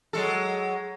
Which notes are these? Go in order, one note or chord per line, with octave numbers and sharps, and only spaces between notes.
F#3 G#3 A4